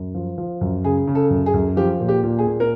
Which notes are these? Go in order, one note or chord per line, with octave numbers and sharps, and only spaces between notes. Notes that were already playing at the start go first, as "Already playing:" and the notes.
Already playing: F#2
F3
F3
F#2
C#3 G#4
C#3
A4
F#2
G#4
F#2
F3 G4
A#2
G4
A#2
G#4
A#2
A#4